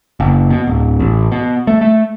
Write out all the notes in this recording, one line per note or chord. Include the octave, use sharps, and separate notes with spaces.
F#1
B2
D1
A1
B2
A3
A3